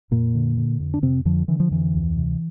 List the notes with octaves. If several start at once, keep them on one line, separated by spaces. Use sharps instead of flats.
F2 A#2 A#3
D3
D3
F2
D4
F2 C3 C4
F2 D3 F3
D3 E3
F3
F2 E3
D2
C3